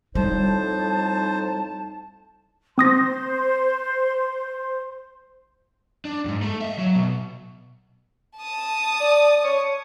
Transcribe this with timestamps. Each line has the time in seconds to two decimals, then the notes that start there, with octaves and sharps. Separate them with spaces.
0.15 F2 A2 G3 D#4 C5 A5
2.78 C4 C5 C6 D#6 A#6
6.05 D4
6.25 E2 G#2
6.42 A3
6.61 D#5 E5
6.79 F#3
6.95 B2
8.37 A5 D#6
9.00 D5
9.44 C#5